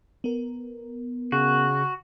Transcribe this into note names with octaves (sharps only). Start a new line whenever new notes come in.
B3 A#4
C#3 F#4